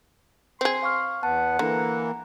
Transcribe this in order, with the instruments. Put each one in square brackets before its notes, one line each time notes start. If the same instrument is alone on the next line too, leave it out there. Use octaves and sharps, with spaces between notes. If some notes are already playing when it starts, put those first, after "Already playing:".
[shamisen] C4 G#4 [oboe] C6
[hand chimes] F5 C#6 F6
[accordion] E2 B3 [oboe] F#5 [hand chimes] A5
[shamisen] D3 [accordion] E3 A#3 [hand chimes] A#5